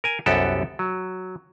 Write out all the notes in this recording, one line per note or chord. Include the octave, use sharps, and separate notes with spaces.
A#4 G#5
C2 F#2 B3 F#4 G4 A4
F#3